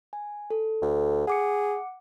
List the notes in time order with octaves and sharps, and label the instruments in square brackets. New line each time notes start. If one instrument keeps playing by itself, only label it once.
[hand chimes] G#5
A4
[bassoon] D2
[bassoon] G#4 [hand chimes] F#5 D6 C#7